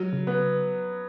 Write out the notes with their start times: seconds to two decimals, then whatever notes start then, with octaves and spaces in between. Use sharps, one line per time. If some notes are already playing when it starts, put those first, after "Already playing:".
Already playing: F#3
0.13 C#3
0.27 B3